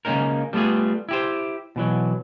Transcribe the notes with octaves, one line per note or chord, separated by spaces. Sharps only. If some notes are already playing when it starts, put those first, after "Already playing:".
C#3 G#3 A#3 C#4 D#4 A#4
G3 A3 B3 F4 G#4
E4 G4 C5
B2 E3 F#3